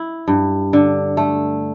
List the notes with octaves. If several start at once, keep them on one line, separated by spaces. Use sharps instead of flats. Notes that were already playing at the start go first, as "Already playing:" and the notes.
Already playing: E4
G2
D3
A3